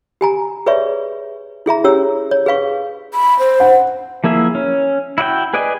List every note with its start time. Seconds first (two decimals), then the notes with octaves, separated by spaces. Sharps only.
0.21 G4 G#5 A#5
0.66 G#4 B4 C#5 D5 E5 C#6
1.66 E4 G#4 E5 A#5
1.84 C#4 G4 G#4 C#5 E6
2.31 C#5
2.46 G#4 B4 F5 C#6
3.14 B5
3.39 C5
3.60 F#5
4.24 F3 A#3 E4 G#4 E5
4.55 C#4
5.18 E4 F#4 D5 G5
5.54 G#4 B4 D5 D#5 G#5